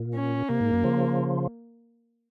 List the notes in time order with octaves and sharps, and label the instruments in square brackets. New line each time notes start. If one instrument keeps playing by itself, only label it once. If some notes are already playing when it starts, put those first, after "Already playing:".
Already playing: [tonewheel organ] A#2
[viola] C#4
[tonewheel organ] C3 [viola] A#3
[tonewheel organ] G#2
F#2
C#3 F3